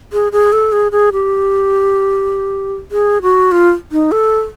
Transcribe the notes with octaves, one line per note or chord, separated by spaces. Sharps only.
G#4
G#4
A4
G#4
G#4
G4
G#4
F#4
F4
D#4
A4